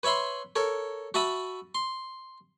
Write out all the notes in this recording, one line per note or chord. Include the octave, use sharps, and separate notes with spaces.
B4 C#5 E5 B5 C6
A4 A#4 C#5
F#4 E5 A5 B5 D#6
C6